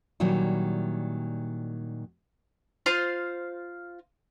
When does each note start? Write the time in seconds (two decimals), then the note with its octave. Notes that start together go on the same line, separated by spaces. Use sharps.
0.20 A#2 D#3 F#3 G3 E4
2.86 F4 C5 F5 C6